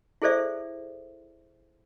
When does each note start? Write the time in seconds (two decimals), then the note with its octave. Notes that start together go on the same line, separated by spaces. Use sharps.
0.22 E4 G#4 A4 C5 D5 E5